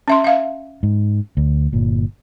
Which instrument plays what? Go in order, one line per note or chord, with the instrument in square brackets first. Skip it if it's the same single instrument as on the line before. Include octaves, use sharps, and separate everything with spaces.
[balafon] C#4 E5 C6
E5 F5
[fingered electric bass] G#2
D2
G1 A#2